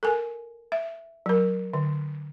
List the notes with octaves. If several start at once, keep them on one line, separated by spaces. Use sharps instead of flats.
A4 A#4 G#5
E5
F#3 A#4
D3